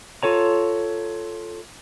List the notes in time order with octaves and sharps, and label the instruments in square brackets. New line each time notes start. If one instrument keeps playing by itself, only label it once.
[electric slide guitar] F4 A4 C#5 A#5